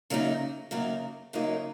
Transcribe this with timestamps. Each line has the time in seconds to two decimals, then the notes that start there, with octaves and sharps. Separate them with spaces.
0.10 F#2 C#3 F#3 A#3 D#4
0.71 F#2 C#3 F#3 A#3 D#4
1.33 F#2 C#3 F#3 A#3 D#4